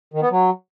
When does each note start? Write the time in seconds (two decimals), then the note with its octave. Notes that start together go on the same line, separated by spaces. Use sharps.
0.14 D#3
0.22 B3
0.31 F#3